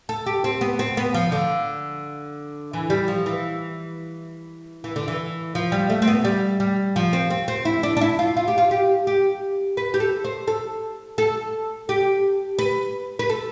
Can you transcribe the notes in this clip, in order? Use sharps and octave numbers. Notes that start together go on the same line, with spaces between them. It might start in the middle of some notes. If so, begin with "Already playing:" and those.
A4
G4
C4
B3
C4
B3
F3
D3
E3
G3
F3
E3
E3
D3
E3
F3
G3
A3
C4
B3
G3
G3
F3
C4
C4
C4
E4
D4
D4
E4
F4
F4
G4
F4
G4
G4
B4
G4
A4
C5
A4
A4
G4
B4
B4
A4